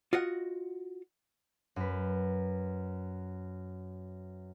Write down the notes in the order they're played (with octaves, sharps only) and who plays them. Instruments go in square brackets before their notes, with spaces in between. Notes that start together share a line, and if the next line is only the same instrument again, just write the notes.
[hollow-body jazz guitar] F4 F#4 D#5 F#5
[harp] F#2 B4